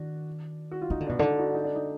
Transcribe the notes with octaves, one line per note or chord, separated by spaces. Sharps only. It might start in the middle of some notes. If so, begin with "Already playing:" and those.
Already playing: D#3 D4 F#4
F#4
F4
D#3 D#4
D3
B2 D4
D3 D#4
D#4 F#4
D#4
D4
D#4